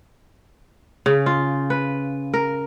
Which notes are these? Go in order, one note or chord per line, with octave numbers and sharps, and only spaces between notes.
C#3
F4
B4
A#4